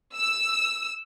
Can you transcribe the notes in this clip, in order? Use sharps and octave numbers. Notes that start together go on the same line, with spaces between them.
E6